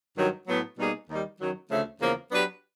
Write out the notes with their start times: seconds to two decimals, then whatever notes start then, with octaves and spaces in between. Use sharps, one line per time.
0.17 G2 D#3 F#3
0.48 A2 F#3 B3
0.79 B2 G3 A#3 D#4 G#4
1.09 D#2 D#3 G3
1.40 F#2 D#3 F#3
1.70 D2 C#3 F3 A3
2.00 E2 C#3 F3 A#3
2.31 F#3 B3 D4 G4 B4